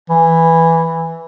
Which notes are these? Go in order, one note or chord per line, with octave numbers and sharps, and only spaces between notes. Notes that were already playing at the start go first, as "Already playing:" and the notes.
E3